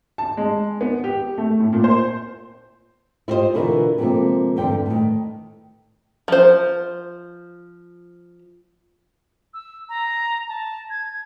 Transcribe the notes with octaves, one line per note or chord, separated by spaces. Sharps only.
A5
G#3
B3
G4
A3
A2
A#2
C5
E4 F4 G4 C5 D#5
B2 D3 E3 E4 F4 A#4
C3 F3 G#3 A#3 C4 A4
E2 G2 D3 G5
A2 D#3
F3 C5
E6
A#5
A5
G#6